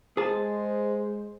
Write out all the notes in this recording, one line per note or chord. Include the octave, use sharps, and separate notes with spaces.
G#3 G#4 C5 A5